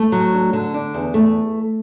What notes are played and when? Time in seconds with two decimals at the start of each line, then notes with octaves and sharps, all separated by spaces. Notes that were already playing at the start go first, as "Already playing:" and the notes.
Already playing: A3
0.12 F#3
0.34 D4
0.53 D3
0.74 D4
0.94 E2
1.14 A3